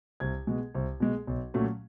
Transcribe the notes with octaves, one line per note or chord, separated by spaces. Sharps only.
C2 G#6
B2 G#3
C2
B2 G#3
B1
A#2 F#3 A3 C#4